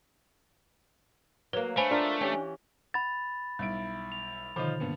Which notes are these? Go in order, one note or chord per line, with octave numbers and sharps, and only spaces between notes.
F#3 A#3 B4
A3 D4 C5 G#5 B5
D4 F4 A#4
E3 C#4 G4
F#5 B5 A6
B1 G3 E4 D7
F7
B2 D3 D#3 F3 D#4 F4
G2 A#2 B3